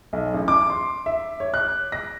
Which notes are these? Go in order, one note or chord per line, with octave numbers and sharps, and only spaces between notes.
B1
A1
D6
C6
E5
C#5
F#6
A#6